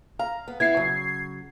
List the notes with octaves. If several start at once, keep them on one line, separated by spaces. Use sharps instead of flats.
F5 A#5
B3
B3 E4 G#6 C7
C#3 F#3